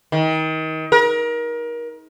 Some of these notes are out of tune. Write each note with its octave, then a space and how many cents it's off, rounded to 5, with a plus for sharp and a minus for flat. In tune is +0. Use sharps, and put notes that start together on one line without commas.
D#3 +30
A#4 +30